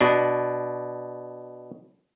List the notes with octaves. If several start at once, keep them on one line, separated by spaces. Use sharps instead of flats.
B2 D4